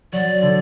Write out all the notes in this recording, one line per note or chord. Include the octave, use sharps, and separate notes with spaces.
F#3 D5
D3